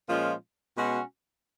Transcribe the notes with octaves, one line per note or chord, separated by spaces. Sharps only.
A#2 F3 G#3 C#4 F4
B2 G#3 C#4 F#4